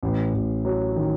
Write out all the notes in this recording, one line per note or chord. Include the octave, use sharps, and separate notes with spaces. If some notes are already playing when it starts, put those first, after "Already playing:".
A1
A1
F#3
D#3